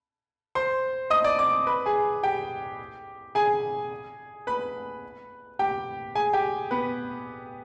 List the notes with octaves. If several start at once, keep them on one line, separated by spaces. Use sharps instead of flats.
C5 C6
D#5 D#6
D5 D6
D5 D6
B4 B5
G#4 G#5
G4 G5
G#4 G#5
B4 B5
G4 G5
G#4 G#5
G4 G5
B3 B4